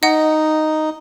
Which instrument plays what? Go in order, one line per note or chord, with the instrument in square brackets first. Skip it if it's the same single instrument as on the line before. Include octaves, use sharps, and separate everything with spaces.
[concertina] D#4 [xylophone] D#5 F#5